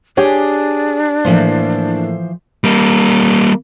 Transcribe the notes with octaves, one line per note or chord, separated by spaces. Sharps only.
D4 G4 G#4 C#5
A2 E3 F3 A#3 C5
G3 A#3